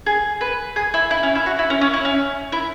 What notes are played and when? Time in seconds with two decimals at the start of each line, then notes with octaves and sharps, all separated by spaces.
0.06 G#4
0.41 B4
0.76 G#4
0.94 E4
1.11 E4
1.23 C#4
1.35 E4
1.46 F#4
1.59 E4
1.70 C#4
1.81 C#4
1.93 E4
2.05 C#4
2.52 E4